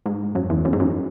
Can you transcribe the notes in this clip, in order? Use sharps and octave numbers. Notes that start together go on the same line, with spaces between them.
G#2
F#2
E2
F#2
G#2
F#2